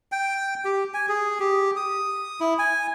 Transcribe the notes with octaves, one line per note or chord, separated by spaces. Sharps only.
G5
G4
G#5
G#4
G4
D#6
E4
G#5